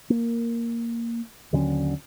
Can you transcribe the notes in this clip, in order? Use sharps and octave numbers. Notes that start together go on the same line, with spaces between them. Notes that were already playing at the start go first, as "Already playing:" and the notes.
A#3
D#2 D3 F#3 C#4